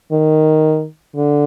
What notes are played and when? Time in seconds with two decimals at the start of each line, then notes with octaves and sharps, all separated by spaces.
0.12 D#3
1.16 D3